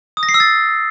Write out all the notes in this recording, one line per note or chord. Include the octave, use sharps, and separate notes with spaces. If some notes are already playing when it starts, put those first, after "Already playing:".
D#6
A#6
C7
E6
A6